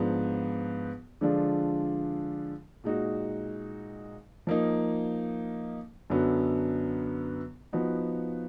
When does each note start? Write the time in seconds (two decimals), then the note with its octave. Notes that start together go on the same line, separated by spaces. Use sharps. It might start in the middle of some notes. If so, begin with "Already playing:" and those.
Already playing: G#2 F3 B3 D4 F4
1.21 D3 F3 G#3 D4 F4
2.84 A#2 G#3 D#4 F#4
4.47 F3 A#3 D#4
6.10 F#2 D3 F#3 B3
7.73 F3 B3 D#4 F#4